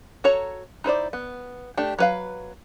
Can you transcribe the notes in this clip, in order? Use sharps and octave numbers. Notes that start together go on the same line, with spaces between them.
F#4 A4 C#5 A#5
D#4 E4 C5 D5
B3
A3 D4 G4 G5
F#3 B4 F5